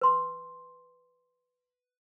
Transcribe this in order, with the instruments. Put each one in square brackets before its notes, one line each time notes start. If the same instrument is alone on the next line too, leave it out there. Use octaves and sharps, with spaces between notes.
[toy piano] B4 C6